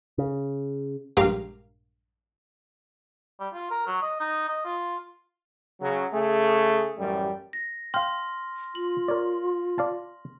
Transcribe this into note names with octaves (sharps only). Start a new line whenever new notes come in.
C#3
A#1 G2 G#3 G4 A#4 F5
G3
F4
A#4
F#3
D#5
D#4
D#5
F4
C#3 F#3
C#3 A3 G#4
A1 F#2 G3
A#6
F5 G5 C6 F6
F4 F#7
A#4 C#5 D5
D5 F5 A5